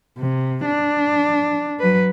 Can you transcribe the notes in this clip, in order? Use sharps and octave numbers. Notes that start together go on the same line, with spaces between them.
C3
D4
F#3 B4